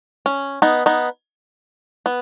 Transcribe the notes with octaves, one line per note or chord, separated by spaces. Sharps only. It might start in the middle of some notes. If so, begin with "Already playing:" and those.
C#4
B3 D#4
B3 D#4
B3